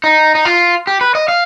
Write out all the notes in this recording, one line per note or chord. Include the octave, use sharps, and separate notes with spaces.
D#4
D#4
F4
G4
B4
D#5
F5